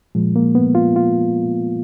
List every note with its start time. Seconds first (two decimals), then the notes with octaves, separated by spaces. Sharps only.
0.15 A#2 F3 G#3
0.36 A#3
0.55 B3
0.75 F4
0.96 F4